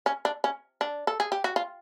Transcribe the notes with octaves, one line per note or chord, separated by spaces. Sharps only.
C#4
D4
C#4
D4
A4
G#4
G4
F#4
F4